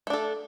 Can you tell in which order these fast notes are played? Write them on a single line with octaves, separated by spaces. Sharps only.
A3 D4 A4